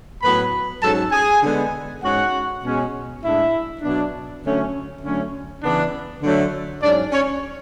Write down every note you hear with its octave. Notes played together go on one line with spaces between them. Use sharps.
A2 F#3 B3 B4 B5
G#2 F#3 C#4 A4 A5
G#4 G#5
D3 G#3 B3
G#2 G#3 C#4 F#4 F#5
B2 G#3 C#4
A2 G#3 D4 E4 E5
B2 F#3 B3 D4
D3 F#3 A3 C#4
D3 F#3 A3 C#4
C#3 E3 B3 D4
D3 F#3 A3
G#2 F#3 C#4 D4 D5
C#4 C#5